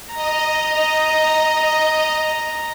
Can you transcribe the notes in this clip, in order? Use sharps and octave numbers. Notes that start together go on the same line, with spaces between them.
D#5 A#5